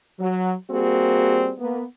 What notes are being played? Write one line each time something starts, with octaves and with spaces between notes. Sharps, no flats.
F#3
G3 A#3 C4 F#4 G#4
A#3 B3